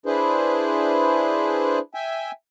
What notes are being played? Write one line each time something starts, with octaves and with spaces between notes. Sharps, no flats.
D4 E4 G#4 B4 C5
E5 G5 G#5